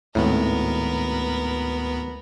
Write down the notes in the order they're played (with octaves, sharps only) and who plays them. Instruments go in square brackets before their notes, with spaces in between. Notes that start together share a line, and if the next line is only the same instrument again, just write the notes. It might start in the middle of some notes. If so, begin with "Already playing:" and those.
[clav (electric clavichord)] G#1 A2 [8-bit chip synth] D2 B3 [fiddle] A#4 B4